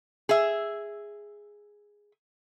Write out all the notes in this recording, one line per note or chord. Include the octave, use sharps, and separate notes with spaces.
G#4 E5